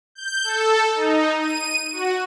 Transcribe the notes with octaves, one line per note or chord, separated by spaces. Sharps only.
G6
A4
D#4
D#7
F#4